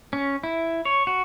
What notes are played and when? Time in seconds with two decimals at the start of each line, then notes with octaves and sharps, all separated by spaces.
0.13 C#4
0.44 E4
0.85 C#5
1.07 F#4